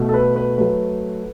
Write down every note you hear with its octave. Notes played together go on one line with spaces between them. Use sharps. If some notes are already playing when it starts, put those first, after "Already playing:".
Already playing: B2 A3
A4
B4
B4
F#3 A3 B4